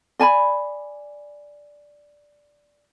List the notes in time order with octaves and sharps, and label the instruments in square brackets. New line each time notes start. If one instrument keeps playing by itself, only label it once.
[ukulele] D5 G#5 A5 B5